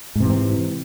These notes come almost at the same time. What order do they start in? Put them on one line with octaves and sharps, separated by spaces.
G#2 C3 E3 C4